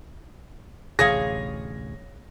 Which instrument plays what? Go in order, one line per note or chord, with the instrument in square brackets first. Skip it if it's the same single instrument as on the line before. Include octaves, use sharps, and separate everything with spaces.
[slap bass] A1 D2 C3 [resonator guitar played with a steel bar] G#4 C#5 F5 [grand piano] A#6